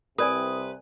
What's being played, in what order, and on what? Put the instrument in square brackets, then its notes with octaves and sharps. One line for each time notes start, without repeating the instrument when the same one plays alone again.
[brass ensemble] C2 C3 [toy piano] A#4 D5 G#5 [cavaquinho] B4 [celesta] D#6